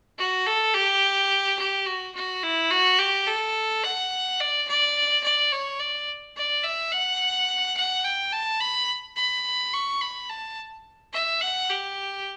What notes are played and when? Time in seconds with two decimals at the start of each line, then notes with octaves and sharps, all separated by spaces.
0.18 F#4
0.46 A4
0.74 G4
1.59 G4
1.86 F#4
2.15 F#4
2.43 E4
2.71 F#4
2.99 G4
3.27 A4
3.84 F#5
4.39 D5
4.68 D5
5.24 D5
5.52 C#5
5.80 D5
6.36 D5
6.64 E5
6.92 F#5
7.77 F#5
8.04 G5
8.32 A5
8.60 B5
9.16 B5
9.73 C#6
10.01 B5
10.29 A5
11.13 E5
11.41 F#5
11.70 G4